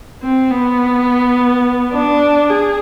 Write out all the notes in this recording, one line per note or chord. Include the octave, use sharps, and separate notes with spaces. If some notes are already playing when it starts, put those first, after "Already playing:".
C4
B3
D4
G#4